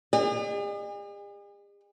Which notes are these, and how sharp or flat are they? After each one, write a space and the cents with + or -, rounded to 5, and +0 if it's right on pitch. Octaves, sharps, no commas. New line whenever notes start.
G#4 -45 D#5 -45